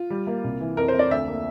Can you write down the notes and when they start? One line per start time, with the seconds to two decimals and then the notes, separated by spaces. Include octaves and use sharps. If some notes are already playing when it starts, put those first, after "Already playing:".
Already playing: F4
0.10 G3
0.27 A#3
0.44 C2
0.60 E3
0.77 F2 A#4
0.88 C5
0.94 F2
0.99 D5
1.11 D2 E5
1.28 A#3